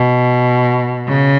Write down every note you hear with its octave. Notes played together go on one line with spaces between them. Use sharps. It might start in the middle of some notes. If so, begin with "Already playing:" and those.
Already playing: B2
C#3